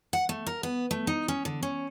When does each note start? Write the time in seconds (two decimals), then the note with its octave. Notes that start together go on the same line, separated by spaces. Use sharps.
0.13 F#5
0.29 A3
0.47 A#4
0.63 B3
0.91 A3
1.07 D#4
1.28 C#4
1.45 D3
1.63 C#4